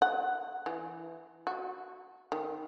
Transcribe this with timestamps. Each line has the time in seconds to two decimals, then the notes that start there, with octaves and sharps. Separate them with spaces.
0.02 F#5
0.66 E3
1.47 F#4
2.32 D#3